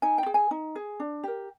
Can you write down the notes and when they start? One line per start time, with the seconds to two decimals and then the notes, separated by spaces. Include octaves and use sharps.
0.02 D#4 G#5
0.18 G5
0.26 G#4
0.34 G#5
0.51 D#4
0.76 G#4
1.00 D4
1.24 G4 A#4